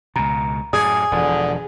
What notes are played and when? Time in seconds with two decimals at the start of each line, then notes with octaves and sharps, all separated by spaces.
0.16 C#2 B2 A#5
0.73 F#2 A2 G#4 D5 D#6
1.12 E1 D3 F3